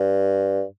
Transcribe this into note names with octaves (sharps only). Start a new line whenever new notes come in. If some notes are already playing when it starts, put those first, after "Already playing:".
Already playing: G2